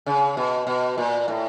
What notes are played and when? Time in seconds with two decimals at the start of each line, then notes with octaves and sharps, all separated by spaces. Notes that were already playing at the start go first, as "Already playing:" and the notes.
0.06 C#3
0.37 B2
0.67 B2
0.98 A#2
1.28 A2